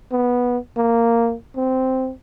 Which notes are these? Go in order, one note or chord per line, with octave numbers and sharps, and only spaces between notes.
B3
A#3
C4